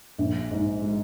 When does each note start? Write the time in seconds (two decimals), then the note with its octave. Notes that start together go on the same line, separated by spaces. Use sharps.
0.18 A#1
0.51 G#2
0.81 G#3